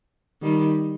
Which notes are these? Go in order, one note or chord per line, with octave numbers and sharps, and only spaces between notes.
D#3 G3